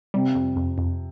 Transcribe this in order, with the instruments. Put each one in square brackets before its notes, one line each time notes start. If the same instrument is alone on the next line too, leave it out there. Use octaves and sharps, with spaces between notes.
[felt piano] C3 [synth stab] G3
[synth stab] F2
F2
F2